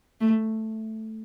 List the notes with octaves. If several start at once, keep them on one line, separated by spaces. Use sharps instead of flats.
A3